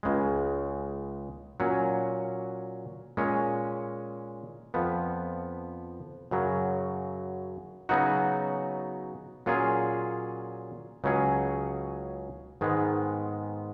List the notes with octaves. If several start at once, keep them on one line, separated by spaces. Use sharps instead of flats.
C#2 C#3 G#3
A#2 F#3 C#4
A#2 G#3 C#4
F2 F3 B3
F#2 C#3 F#3
C#3 F#3 B3 D#4 F#4
A#2 F#3 C#4 F4 G#4
C#2 C#3 F#3 C#4 G#4
G#2 D#3 G#3 B3